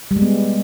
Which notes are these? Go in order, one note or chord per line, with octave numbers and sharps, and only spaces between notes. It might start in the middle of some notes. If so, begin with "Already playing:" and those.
G3
G#3
B3